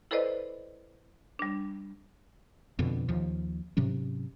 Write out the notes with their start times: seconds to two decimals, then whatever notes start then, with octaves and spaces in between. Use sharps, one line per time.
0.11 E4 A4 B4 C5 D5 D#5
1.39 G3 D4
2.79 F2 B2 D3
3.09 D#2 F3
3.77 G#2 C3 F#3 C#4